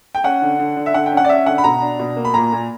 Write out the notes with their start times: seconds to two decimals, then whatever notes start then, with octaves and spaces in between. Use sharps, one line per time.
0.15 G5
0.24 C#4 F#5
0.42 D3
0.59 D3
0.76 D3
0.86 E5
0.94 D3 F#5
1.06 G5
1.12 C#4
1.17 F#5
1.25 D5
1.29 C#4 E5
1.46 D3 F#5
1.58 B5
1.64 B2 A#5
1.82 D4
1.99 B2
2.17 A#3
2.25 B5
2.34 A#2 A#5
2.52 A#2